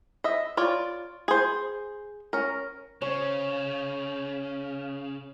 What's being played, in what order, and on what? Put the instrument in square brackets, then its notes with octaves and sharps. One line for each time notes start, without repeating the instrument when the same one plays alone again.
[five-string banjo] D#5 E5
F4 C#5 D5
G#4 C5
C#4 A#4
[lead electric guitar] C#3 [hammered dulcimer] C#5